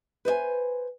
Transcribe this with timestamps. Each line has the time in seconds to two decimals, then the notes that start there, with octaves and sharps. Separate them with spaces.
0.25 B4 C5 D#5 G#5